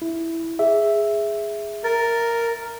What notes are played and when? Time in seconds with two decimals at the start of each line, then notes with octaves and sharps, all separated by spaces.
0.02 E4
0.59 G#4 E5
1.84 A#4 A6